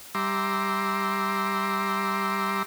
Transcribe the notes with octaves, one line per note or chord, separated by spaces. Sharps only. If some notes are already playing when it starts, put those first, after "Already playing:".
G3 E5 A#5 C6 D6